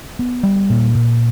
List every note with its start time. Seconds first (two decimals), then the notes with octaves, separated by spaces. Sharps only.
0.19 B3
0.43 G3
0.70 A#2
0.95 A#2